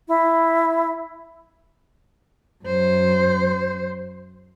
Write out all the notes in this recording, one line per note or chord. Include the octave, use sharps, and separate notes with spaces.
E4
F#2 C5